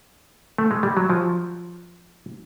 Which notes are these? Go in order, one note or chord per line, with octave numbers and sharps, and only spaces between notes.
A3
G#3
G3
F#3
F3